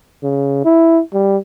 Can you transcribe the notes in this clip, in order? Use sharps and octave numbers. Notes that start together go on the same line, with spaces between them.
C#3
E4
G3